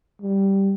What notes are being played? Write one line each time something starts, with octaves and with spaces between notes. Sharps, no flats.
G3